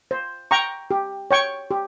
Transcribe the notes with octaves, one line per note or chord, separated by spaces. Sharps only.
C5
G5 A#5 C#6
G4
C#5 G5 C#6
G4